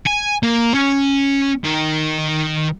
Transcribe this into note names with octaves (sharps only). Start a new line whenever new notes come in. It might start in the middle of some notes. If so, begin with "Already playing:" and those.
G#5
A#3
C#4
D#3